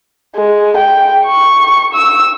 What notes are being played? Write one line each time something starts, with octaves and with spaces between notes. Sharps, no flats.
G#3
G5
C#6
E6